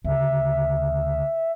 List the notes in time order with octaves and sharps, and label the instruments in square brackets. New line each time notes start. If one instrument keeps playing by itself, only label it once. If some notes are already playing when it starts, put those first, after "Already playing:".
[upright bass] D2 C#3 [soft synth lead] E5